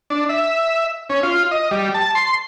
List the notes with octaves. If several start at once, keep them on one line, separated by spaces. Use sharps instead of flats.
D4
E5
C#4
F4
D#5
G3
A5
C6